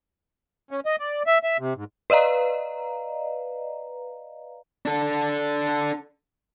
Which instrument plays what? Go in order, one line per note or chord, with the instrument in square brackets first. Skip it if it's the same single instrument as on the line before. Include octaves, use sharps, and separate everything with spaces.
[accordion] C#4
D#5
D5
E5
E5
C3
G#2
[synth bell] B4 D5 D#5 F5 A#5
[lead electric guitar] D4 A4